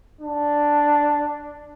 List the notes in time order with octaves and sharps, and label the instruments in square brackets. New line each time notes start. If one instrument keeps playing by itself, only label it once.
[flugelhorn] D4